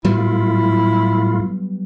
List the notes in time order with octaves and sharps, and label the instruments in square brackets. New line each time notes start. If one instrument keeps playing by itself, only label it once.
[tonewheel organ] A2 F4 [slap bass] F#3 G3 B3 [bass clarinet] E4